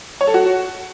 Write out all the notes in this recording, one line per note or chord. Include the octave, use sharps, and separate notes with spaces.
C#5
A4
F#4